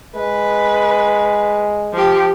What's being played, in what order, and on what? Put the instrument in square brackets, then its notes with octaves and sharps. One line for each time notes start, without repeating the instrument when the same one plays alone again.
[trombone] G#3 [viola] B4
[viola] F3 G4